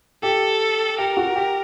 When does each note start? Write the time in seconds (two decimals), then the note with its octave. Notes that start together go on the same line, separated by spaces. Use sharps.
0.23 G4 A4
0.98 G4 A#4
1.17 F#4
1.36 G4